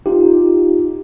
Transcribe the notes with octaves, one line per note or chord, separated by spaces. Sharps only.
D#4 F4 G4